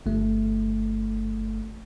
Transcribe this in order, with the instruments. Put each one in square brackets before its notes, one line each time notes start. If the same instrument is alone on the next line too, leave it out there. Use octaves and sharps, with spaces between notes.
[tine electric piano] G1 A3